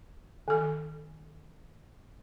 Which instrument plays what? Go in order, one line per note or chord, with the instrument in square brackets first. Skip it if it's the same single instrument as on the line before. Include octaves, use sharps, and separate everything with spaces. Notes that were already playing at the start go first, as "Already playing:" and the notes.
[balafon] D#3 A4